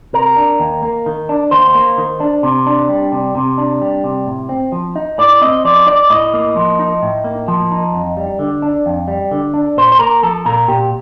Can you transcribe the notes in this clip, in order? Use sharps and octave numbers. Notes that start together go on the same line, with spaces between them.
C3 A#4
D4
D#2
A#3
D#3
D4
D#2 C5
A#3
D#3
D4
C3
D4
G3
C3
C3
D4
G3
C3
A2
C4
F3
D#4
A2 D5
C4 D#5
F3 D5
D#4 D5
A2 D#5
A#3
F3
D#4
A2
A#3
F3
D#4
F2
G3
D3
D4
F2
G3
D3
D4
A#2 C5
C5
A#3 A#4
F3 A4
A#2 A#4
A#2 G4